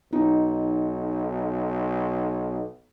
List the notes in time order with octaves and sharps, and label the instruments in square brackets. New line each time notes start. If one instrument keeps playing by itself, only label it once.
[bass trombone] B1 [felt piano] D#4